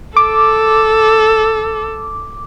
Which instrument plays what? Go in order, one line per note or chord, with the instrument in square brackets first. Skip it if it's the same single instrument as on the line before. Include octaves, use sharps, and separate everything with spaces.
[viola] A4 [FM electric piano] D6